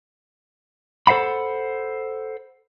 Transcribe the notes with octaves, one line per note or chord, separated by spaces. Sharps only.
A4 C5 F5 F#5 B5